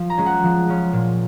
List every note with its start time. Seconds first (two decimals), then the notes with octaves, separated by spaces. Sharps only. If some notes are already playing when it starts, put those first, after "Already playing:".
Already playing: F3
0.10 A#5
0.17 G#3 C#4
0.26 F#5
0.43 F3
0.68 G#3 C#4
0.93 A#2